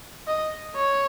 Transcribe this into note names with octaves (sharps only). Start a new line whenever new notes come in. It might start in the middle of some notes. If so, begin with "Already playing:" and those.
D#5
C#5